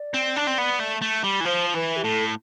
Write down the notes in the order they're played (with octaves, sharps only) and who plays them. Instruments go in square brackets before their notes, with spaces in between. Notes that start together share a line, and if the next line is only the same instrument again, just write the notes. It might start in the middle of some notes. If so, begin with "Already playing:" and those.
Already playing: [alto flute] D5
[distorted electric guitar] C4
D4
C4
B3
A3
A3
G3
E3
[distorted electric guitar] F3 [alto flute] C5
[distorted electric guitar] E3 [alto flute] B4
[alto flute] G4
[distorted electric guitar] A2 [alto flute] A4